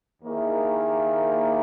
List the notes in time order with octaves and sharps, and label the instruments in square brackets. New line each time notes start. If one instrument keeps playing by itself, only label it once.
[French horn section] D#2 D#3 A#3 E4 G#4